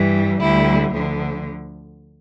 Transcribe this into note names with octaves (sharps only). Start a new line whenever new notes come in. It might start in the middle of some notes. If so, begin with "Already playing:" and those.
Already playing: G2 E3 G3
D2 D3 G3 E4
D2 D3 F3